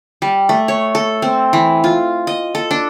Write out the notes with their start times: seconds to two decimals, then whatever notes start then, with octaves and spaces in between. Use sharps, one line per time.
0.22 G3
0.49 A3
0.68 C#5
0.95 A4
1.22 C4
1.53 E3
1.84 F4
2.27 D#5
2.55 A4
2.71 D4